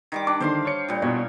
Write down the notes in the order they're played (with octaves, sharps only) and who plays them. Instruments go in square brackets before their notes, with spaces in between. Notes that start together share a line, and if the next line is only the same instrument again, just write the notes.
[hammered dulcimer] D#3 G3 D6
[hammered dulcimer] D4 [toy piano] D6
[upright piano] D3 D#3 [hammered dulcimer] C5 F5 C6
[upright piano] C#5 C#7
[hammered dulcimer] A#2 G3
[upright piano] B2 [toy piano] E4 D5 [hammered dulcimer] C#5